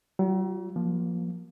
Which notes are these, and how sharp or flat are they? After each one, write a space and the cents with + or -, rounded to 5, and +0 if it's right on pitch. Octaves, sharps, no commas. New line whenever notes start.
F#3 +45 F4 +0
F3 +0 A#3 +15